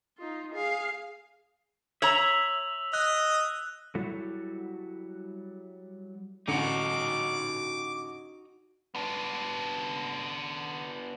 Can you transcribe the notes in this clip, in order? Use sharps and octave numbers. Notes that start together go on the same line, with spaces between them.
D#4 F4
G#4 F5
C#5 E5 A#5 E6 F7 F#7
D#5 F#6
F#3 G3 E4 F#4 A4
A1 D3 D#4 F#4 D6 C#7
B3 D4